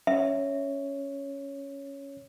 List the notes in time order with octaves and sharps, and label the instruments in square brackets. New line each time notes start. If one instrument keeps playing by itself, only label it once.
[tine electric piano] C#4 C#5 [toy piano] E5